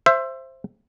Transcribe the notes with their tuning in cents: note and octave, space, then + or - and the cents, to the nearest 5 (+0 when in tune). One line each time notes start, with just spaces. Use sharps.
C5 +10 E5 +20